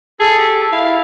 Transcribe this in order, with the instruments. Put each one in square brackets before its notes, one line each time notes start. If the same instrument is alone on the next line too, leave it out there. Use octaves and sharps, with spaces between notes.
[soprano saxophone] G#4 [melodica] A4
[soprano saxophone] G4
[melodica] E4 [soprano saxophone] F5